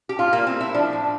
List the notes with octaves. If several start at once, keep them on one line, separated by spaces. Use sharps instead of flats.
G4
A2 F4
G3 A#3
C4
A2 E4
F3 D4
A2